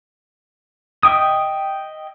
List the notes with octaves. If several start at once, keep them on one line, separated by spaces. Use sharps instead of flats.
D#5 E5 G5 D#6